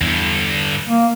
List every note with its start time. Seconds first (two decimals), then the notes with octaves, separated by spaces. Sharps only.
0.01 E2 G2 D3
0.88 A#3